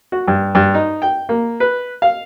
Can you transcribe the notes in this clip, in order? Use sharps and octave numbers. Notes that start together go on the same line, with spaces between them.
F#4
G2
G2
D#4
G5
A#3
B4
F5